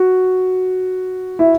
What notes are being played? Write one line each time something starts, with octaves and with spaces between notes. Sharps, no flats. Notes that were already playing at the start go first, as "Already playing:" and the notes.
Already playing: F#4
E4